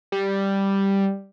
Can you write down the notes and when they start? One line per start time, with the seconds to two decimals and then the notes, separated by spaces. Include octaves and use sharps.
0.12 G3